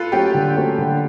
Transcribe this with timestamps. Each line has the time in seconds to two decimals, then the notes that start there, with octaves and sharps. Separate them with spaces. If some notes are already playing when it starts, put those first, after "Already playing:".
Already playing: F4 A4 B4
0.12 F#3 A3 C#4 G4
0.34 D3
0.57 F#3 A3 C#4
0.78 D3